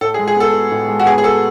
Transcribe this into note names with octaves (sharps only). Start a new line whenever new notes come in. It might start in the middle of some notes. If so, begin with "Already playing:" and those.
A2 A4
G#4
G#3
G#4
B3 A4
F#4
A2
G#3
F#4
B3 G#4
G#4
F#4 A4